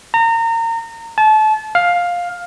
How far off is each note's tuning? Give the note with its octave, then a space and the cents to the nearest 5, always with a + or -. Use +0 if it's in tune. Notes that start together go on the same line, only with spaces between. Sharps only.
A#5 -30
A5 -30
F5 +10